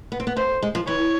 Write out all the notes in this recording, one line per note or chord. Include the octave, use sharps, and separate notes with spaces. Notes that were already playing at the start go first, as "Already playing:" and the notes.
B3
C4
B3
A3 C5
G#3
F3
E3 C#5